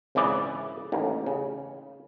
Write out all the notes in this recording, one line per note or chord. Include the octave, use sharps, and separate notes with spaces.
G#1 C#3 E3 D5
A1 D#2
C#3